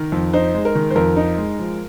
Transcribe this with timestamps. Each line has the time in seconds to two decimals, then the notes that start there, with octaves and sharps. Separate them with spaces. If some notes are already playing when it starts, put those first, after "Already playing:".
Already playing: D#3 A#4
0.12 F2
0.33 D#4 C5
0.54 G#3
0.65 A#4
0.75 D#3
0.91 C5
0.95 F2 A#4
1.16 D#4
1.38 G#3
1.59 F3